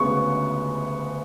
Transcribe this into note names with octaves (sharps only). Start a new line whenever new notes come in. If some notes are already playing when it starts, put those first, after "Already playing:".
Already playing: D2 C#3 G#3 B3 C#6